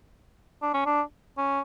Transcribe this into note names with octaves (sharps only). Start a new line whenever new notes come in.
D4
C#4
D4
C#4